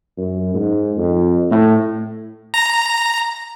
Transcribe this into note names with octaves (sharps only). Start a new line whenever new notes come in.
F#2
G#2
F2
A2
A#5